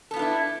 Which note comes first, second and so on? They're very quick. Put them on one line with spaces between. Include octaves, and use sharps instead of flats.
A4 B3 F4 D4 E4